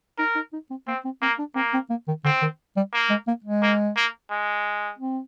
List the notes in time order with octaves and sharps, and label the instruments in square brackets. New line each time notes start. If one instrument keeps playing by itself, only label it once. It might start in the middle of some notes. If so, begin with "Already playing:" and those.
[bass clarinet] D#4 [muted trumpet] A#4
[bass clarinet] D#4
D#4
C4
[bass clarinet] A#3 [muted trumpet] C4
[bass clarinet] C4
[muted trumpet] A#3 [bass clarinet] C4
[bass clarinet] D4
[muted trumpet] A#3 [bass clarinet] C4
[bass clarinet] C4
A#3
D#3
[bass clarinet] D3 [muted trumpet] C4
[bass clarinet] D#3
G3
[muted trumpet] A#3
[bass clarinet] G#3
A#3
G#3
[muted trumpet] A#3
A#3
G#3
[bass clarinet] C4